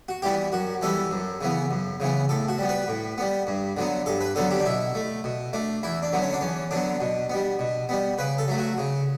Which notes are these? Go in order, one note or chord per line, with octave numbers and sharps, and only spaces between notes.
F#4
E3 G3 B3 G4
F#2 F#4
E3 G3 B3 A4
F#2
C#3 E3 B3
F#2
C#3 E3 B3
A2 A4
F#4
G3 B3
B4
A2
G3 B3
G2
D3 F#3 B3
G2 A4
B4
D3 F#3 B3 A4
G4
D4
B2 E4
A3
B2
A3 D4
E2 E4
D4
D3 F#3 B3
C#4
D4
E2 C#4
D3 F#3 B3 D4
B2
G3 B3
B2
G3 B3
C#3 B4
A4
F#3 A3
F#4
C#3